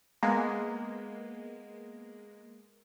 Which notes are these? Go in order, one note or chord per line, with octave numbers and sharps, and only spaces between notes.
G#3 A#3 B3